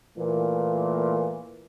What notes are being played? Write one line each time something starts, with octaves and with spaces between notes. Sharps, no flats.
A#2 E3 A3 A#3